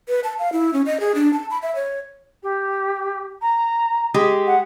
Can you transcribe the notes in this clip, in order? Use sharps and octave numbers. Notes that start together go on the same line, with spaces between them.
B4
A5
F5
E4
C#4
D#5
G#4
D4
A5
B5
E5
C#5
G4
A#5
G#3 G4
F#5